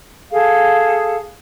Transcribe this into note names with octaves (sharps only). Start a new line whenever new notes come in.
G#4 A4 F5